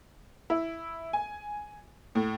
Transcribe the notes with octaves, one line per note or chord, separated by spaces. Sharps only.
E4
G#5
A2